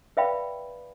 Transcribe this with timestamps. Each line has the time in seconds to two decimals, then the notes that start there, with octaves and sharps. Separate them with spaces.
0.17 B4 D5 E5 F5 G5 B5